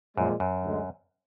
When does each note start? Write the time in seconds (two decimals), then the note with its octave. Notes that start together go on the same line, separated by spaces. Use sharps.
0.17 F#2 A#2 F3 G#3
0.40 F#2
0.64 D2 D3 G#3